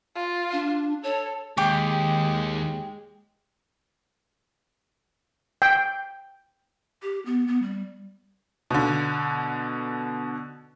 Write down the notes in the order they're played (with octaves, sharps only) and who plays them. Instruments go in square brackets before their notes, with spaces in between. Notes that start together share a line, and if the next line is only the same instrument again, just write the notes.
[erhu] F4
[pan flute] D4
[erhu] A4 [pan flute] C#5
[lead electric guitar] D#2 [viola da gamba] G#3 [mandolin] G4 D6
[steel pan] G5
[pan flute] G4
B3
B3
G3
[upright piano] B2 D3